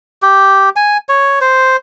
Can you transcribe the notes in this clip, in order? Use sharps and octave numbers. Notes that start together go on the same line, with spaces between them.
G4
G#5
C#5
C5